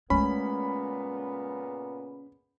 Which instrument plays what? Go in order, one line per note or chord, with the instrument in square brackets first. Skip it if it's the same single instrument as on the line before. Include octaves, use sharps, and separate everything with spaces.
[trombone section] A#2 C#3 B3 [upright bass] G#3 A3 [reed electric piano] C#4 [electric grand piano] B5